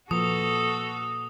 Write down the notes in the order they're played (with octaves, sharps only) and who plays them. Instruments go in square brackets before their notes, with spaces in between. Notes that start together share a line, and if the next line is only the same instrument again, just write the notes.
[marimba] A#2 A#3 B4 [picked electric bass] F3 [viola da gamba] F#4 A4 [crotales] D#6